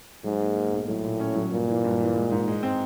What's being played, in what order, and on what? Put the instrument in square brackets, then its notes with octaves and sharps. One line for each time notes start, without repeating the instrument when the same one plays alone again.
[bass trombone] G#2 [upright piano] F#3
[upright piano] A#3
A#3
B1
[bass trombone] A2 [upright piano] F#3
[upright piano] A#2
C#4
F#3
[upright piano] G2 [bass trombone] A#2
[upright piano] E3
G2
E3
G#3
G#2
G#3
C4